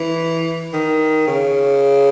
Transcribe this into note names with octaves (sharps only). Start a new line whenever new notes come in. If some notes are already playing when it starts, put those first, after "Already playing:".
Already playing: E3
D#3
C#3